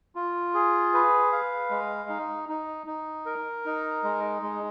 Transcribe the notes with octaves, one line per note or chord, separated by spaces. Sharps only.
F4
G#4
B4
F5
G#3
D#4
D#4
D#4
A#4
D#4
G#3
G#3